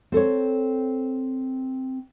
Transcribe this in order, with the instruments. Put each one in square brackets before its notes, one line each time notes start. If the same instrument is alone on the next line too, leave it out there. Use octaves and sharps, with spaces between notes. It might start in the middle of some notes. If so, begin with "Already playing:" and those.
[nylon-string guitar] C4 A4 C5 C#5